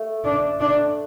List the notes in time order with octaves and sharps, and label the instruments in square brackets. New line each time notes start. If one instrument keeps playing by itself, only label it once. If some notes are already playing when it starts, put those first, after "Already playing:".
Already playing: [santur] A3
[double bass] D4
D4